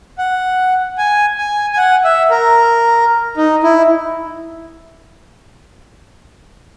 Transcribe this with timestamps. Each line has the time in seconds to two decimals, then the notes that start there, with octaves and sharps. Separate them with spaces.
0.18 F#5
0.98 G#5
1.38 G#5
1.73 G#5
1.77 F#5
2.04 E5
2.30 A#4
3.37 D#4
3.64 E4